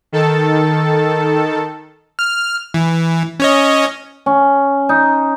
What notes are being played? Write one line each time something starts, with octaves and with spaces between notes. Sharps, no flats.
D#3 A4 A5
F6
E3
C#4 C#5 D#5
C#4
D#4